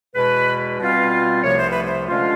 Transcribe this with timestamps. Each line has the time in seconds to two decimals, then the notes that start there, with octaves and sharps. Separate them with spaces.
0.15 E2 B2 G#3 B4
0.79 B2 G3 C4 F4
1.43 C2 C3 F3 A3 C#5
1.57 C5
1.71 B4
1.84 C5
2.08 D3 F3 G#3 C#4 F4